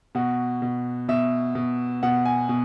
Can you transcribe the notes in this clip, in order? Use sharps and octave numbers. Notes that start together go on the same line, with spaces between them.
B2 F#4
B2
B2 E5
B2
B2 F#5
G#5
B2